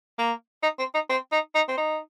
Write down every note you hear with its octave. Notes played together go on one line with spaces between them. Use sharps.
A#3
D#4
C4
D#4
C4
D#4
D#4
C4
D#4